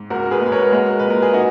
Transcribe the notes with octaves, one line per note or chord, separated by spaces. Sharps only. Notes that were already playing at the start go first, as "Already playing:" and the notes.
Already playing: G#2
C#2 F#4 A#4
G#4 B4
G#3 B4
A#4 C#5
G#3 F#4 A#4
A#2 B4
A#4
G#4
D#4 F#4